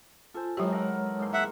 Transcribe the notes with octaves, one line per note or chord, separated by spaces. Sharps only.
F4 A4 C5 G#5
D#3 E3 F#3 G#3 G4 C#5
A4 A#4 F#5
G#2 A#3 C6
E5 F#5